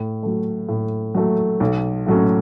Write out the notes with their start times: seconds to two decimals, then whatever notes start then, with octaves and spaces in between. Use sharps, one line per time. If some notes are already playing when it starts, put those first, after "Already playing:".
Already playing: A2
0.23 F#3 A3
0.69 A2
1.15 F#3 A3
1.60 B1
2.07 A2 F#3 A3 C#4